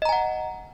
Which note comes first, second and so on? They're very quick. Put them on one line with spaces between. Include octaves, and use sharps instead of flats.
D#5 A#5 G#5 F#5